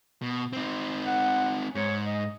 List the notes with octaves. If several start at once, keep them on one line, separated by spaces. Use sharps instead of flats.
B2
C4 D#4
F#5
G#2 C#5
D#5